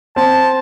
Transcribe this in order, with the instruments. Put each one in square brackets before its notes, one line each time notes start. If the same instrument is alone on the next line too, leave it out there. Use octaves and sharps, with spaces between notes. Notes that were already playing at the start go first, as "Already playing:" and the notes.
[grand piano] C4 [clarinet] A5